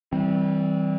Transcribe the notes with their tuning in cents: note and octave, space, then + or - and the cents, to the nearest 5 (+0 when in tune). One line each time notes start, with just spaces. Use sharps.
E3 -30 G3 -15 C4 +0